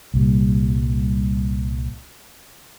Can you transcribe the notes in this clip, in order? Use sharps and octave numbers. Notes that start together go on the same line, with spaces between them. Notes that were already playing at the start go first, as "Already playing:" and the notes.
C2 A#2 G3